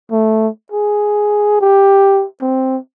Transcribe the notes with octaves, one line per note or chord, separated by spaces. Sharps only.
A3
G#4
G4
C4